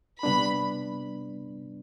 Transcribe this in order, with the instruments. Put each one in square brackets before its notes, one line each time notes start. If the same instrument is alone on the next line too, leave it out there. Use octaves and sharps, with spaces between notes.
[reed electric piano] C3 G3 B3 D4 [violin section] B5